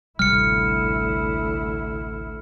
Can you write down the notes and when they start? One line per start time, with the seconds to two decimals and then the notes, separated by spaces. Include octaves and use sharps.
0.19 A1 D2 C3 G3 E4 F6 C#7